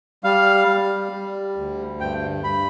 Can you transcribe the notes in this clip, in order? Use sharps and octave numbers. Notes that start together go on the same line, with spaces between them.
G3 F5
G3
G3
D2
G2 G5
G2 B5